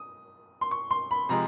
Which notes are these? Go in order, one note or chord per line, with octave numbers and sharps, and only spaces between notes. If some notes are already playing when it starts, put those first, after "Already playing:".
Already playing: D#6
C6
C#6
C6
B5
C3 F3 G#3 A#5